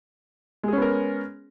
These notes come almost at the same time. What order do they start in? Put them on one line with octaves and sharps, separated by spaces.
G#3 G#4 C#4 B3 A#4